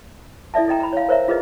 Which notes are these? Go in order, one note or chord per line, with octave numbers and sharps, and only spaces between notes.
E4 A4 D5 E5 A5
A4 D#5 G5 A#5
A#5 B5
C#5 F5
A#4 C5 C#5 E5 A#5
F4 G#4 A#4 B4 D#5